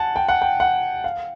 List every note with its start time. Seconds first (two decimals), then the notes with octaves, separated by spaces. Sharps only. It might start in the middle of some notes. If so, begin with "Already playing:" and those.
Already playing: F#5 G#5 A5
0.16 G5
0.28 F#5
0.42 G5
0.60 F#5
1.04 F5